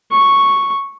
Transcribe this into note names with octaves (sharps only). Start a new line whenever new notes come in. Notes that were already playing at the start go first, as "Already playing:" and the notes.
C#6